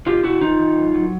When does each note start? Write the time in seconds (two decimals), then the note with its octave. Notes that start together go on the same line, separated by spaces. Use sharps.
0.06 B2 F4 G4
0.23 B2 E4 F#4
0.41 D#3 D#4 F4
0.59 D#3
0.76 F#2
0.94 F#3